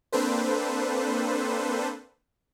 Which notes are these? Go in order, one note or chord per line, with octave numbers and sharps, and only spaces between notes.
A#3 C4 D4 A4 B4 C5